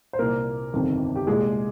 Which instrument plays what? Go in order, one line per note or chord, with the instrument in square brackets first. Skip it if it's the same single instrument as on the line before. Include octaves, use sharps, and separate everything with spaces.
[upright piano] C5
C2 A#2 A#3 A#4
G1 F2 C3 D#3
G4
C2 A#2 G#3 G#4